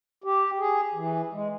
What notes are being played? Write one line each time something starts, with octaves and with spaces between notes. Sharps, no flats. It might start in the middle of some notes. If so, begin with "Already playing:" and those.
G4
G#4
E3
G#3